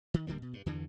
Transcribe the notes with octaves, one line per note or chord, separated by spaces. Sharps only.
D#3
D1 D3 G3 A#3
B2
G2
E2 G2 D3 E3